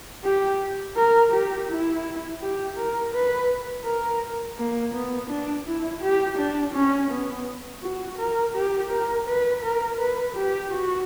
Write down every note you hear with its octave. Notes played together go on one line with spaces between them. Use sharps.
G4
A#4
G4
E4
G4
A#4
B4
A#4
A#3
B3
D4
E4
G4
D4
C#4
B3
F#4
A#4
G4
A#4
B4
A#4
B4
G4
F#4